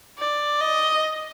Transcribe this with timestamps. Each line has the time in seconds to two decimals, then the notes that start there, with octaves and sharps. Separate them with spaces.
0.18 D5
0.61 D#5